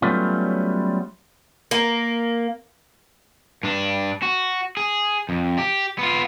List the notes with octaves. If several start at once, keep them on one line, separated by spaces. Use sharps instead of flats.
F#3 G3 A3 B3 C#4 F4
A#3
G2 D4
F#4
G#4
F2
G4
B3 F4